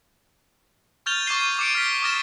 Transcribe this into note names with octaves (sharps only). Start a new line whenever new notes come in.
C#6 F6 G6 A6 F7 G7
C#6 D6 G#6 A6 C7 D#7
D6 C#7 D7
F6 G6 B6 D7
D6 D#6 F6 A6 A#6 E7